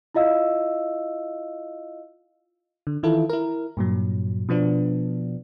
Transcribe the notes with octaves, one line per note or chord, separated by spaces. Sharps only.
E4 F4 D#5 F5 E6
D3
D#3 E3 E4 F4 A4
E4 A#4
G2 A#2 F#3
B2 F3 B3 D4